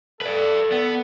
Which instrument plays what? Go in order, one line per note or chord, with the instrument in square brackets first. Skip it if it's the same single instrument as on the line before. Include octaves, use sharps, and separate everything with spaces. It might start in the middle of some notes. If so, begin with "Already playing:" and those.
[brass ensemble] A4 [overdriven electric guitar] B4 D5
[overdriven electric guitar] B3